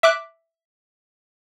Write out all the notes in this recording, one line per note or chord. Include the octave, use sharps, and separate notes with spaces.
E5 D6 F#6